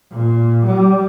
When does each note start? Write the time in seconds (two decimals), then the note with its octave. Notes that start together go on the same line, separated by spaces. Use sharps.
0.12 A#2
0.66 G3